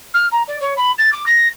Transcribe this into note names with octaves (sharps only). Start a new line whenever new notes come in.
F6
A#5
D5
C#5
B5
A6
D6
A#6